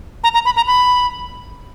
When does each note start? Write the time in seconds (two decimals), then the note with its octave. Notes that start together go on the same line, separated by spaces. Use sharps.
0.24 A#5
0.34 A#5
0.45 B5
0.56 A#5
0.67 B5